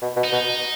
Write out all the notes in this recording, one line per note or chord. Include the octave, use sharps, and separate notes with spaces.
B2
B2
D#4
B2